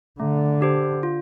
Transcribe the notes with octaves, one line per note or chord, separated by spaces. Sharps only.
D3 A3
D4 G4 C5
F4